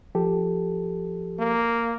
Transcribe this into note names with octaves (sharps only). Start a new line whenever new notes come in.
F3 G4 A4
A#3